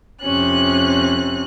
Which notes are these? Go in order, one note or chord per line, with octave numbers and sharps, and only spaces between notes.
F2 C3 C#4 F#6